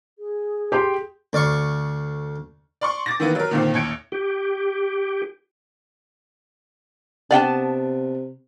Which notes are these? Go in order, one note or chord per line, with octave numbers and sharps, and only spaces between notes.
G#4
G4 G5 C6
D2 D5 F5 C#6
D5 C6 C#6
D6 A6 A#6
D#3 E3 A#3 B3
F#3 A#4
A#2 D3 D#3 A#3 C4
A1 D#2 G#6 C#7 D7
G4
C3 B3 D4 D5 F5 G5 A5